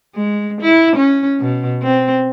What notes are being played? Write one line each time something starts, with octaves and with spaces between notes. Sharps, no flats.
G#3
E4
C#4
B2
C4